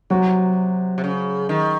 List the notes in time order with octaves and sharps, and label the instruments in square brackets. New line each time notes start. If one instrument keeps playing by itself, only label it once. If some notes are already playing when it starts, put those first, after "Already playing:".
[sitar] C3 [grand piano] F#3 F#4
[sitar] C3
C#3
D#3